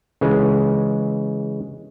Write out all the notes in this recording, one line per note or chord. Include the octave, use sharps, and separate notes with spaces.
C#3 E3 G#3